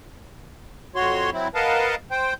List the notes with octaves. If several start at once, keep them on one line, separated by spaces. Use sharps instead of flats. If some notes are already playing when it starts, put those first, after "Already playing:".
F2 F#4 C#5 C6
F#3 C4 E4
A#4 B4 D#5 F5 F#5 A5
C5 G5